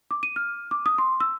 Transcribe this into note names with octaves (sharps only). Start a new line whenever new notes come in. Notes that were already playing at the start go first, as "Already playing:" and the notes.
D6
D#7
F6
D6
D#6
C6
E6